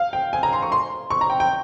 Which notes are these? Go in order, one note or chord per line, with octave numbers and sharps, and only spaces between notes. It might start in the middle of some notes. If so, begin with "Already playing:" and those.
Already playing: F5
G5
G#5
A#5
C6
C#6
C6
C#6
A#5
G5
G5